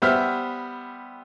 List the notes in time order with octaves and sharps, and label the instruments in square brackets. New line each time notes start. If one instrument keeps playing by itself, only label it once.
[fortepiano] G3 B3 C5 E5 F6